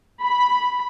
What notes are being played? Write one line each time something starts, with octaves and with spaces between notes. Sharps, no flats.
B5